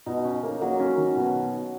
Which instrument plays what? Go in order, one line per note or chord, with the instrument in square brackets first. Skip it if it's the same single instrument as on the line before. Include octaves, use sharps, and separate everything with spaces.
[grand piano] B2 [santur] D#4
[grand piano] C#4
A#3
[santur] F#3 [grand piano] A#3
[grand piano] C#4
D#3
B2